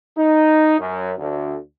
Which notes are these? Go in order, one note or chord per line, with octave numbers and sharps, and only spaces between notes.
D#4
F#2
D2